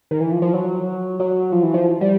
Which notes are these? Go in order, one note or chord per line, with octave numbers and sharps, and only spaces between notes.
D#3
E3
F3
F3
F#3
F#3
F3
E3
F3
G3